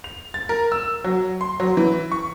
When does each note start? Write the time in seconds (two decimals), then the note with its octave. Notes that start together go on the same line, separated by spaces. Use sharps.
0.04 F7
0.34 A6
0.49 A#4
0.72 E6
1.04 F#3
1.41 C6
1.60 F#3
1.77 E3
2.12 C#6